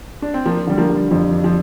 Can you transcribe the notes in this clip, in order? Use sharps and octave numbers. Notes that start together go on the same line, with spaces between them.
D4
C4
F3 A#3 D4
D3 G3
F3 A#3
G3
F2 F3
D4
F3